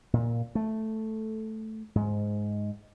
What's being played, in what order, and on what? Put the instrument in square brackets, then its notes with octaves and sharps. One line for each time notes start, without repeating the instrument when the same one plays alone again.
[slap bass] A#2
A3
G#2